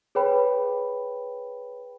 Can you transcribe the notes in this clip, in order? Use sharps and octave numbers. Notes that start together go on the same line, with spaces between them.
G#4 B4 C#5 G5 B5